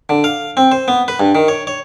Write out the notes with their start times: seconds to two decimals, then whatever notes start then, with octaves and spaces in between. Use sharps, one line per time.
0.09 D3
0.24 F5
0.57 C4
0.72 C5
0.88 B3
1.08 B4
1.20 G2
1.35 D#3
1.48 C#5
1.67 C#5